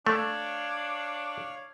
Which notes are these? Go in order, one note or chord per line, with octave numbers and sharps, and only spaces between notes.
A3 D4 C#5 F5